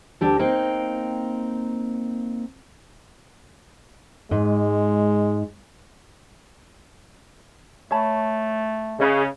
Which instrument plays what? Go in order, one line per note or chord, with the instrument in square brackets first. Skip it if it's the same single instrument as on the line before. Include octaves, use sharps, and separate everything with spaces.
[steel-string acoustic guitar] D2 D4 G4 A4
A#3 C4 D#4 G5
[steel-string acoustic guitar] G#2 [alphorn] G#3
[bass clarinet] A3 [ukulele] C#5 A5 B5
[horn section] C#3 [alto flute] G#4 [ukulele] B4 D#5